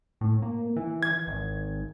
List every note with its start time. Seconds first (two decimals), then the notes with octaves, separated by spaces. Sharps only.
0.21 A2
0.42 A#3
0.76 E3
1.03 G#6
1.27 G#1